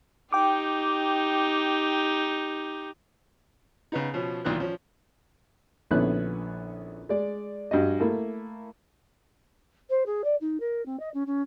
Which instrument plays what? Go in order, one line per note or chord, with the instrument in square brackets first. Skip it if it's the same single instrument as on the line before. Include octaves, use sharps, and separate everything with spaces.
[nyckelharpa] D#4 G4 [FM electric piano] G5 D6
[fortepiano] C#3 B3 D#4
B2 F3 C#4
B1 A#2 D#3 E3 F#6
F3 C#4
A#1 D3 B3 C#4 E4 F#6
G#3 D5
G2 F#4 D#5
A3 A#3 E4
[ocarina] C5
G#4
D5
D#4
A#4
C4
D#5
C#4
C#4